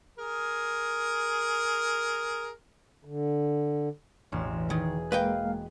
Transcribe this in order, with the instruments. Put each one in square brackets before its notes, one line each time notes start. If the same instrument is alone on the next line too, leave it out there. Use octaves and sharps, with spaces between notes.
[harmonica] G#4 A#4
[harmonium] D3
[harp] E1 A1 E7
[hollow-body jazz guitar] D#3 [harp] G#4
[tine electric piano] G#3 A#3 [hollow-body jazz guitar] B4 D#5 G5 [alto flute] F5